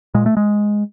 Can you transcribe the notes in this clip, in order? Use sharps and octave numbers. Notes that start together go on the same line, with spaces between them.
A#2 G#3
A3
G#3